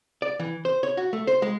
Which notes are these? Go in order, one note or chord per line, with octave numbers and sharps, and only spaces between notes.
D5
E3
C5
C#5
F#4
A3
C5
G#3